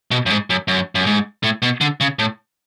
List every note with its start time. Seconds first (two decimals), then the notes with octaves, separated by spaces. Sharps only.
0.11 B2
0.26 F#2
0.30 G#2
0.50 F#2
0.68 F#2
0.95 F#2
1.06 G#2
1.43 A2
1.62 B2
1.81 D3
2.01 C#3
2.19 A2